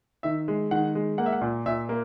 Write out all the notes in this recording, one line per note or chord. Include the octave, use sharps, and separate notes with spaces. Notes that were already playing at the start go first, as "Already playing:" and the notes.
D#3 E5
G#3
D#3 F#5
G#3
A#3 F#5
E5
F#5
A#2
A#2 E5
A#3